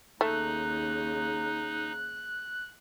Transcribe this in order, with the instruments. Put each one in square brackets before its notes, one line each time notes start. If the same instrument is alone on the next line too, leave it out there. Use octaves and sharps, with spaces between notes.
[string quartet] D#2 C#3 [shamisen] A3 [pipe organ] D#4 [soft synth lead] F#6